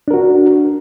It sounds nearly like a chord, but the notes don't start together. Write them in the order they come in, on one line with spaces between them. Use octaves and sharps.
D4 A#4 F#4